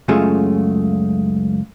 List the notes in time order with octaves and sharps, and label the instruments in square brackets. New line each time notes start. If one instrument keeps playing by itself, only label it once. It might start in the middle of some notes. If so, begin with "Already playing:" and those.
[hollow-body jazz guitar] C#2 F#2 C#3 A3 F4 G#4